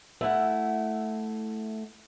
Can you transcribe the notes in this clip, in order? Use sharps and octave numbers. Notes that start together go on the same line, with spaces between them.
A3 E4 F#5